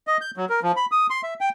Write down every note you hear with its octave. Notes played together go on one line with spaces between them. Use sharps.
D#5
G6
F#3
A#4
F3
B5
D#6
C6
E5
G5